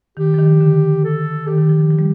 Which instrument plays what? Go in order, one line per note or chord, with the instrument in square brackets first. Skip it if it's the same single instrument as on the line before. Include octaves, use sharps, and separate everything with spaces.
[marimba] D#3 [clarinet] G4
[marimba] F3
D#3
D3
[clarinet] A4
[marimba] D#3 [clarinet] G4
[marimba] D#3
F3
D#3
F3
G3